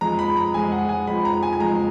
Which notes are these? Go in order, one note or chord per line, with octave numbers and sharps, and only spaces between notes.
F2 F3 G#3 A#5
B5
A#5
F2 F3 G#3 G#5
F#5
G#5
F2 F3 G#3 B5
A#5
G#5
G#5
F2 F3 G#3 A#5